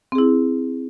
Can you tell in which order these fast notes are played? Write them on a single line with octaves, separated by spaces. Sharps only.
C4 G#4 E4